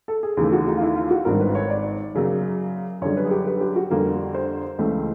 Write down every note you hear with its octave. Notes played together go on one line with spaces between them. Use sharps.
A4
G#4
D#2 C#3 E3 A3 G4
F#4
D#4
F4
E4
F4
F#4
G#1 G2 D#3 A#4
B4
C#5
D5
F#2 C#3 F#3 A#3
F#2 D3 G3 C#5
B4
G#4
G4
B4
G4
F#4
F2 D3 G3 A#3
C5
C#2 C#3 E3 A3